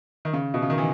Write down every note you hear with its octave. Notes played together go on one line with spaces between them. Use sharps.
D#3
C#3
B2
C#3
D#3
E3